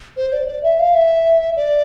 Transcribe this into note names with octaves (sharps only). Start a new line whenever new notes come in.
C5
D5
D5
E5
F5
E5
D5